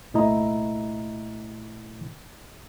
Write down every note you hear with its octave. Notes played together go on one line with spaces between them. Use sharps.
C2 A#2 A3 E4 D#5 A#5